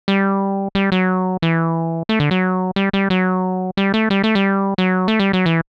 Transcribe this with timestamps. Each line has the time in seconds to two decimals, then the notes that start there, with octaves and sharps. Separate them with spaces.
0.08 G3
0.75 G3
0.92 F#3
1.42 E3
2.09 A3
2.20 D3
2.31 F#3
2.76 G3
2.93 G3
3.10 F#3
3.77 G3
3.94 A3
4.10 G3
4.24 A3
4.35 G3
4.78 F#3
5.08 A3
5.20 G3
5.33 F#3
5.46 E3